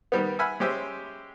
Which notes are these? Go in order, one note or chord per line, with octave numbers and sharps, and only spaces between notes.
D#3 G3 B3
E5 F#5 G#5 B5 F6
G#3 C#4 G4 C5 E5